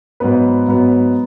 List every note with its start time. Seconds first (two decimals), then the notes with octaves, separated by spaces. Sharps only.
0.20 G#2 F#3 B3 B4
0.68 G#2 F#3 B3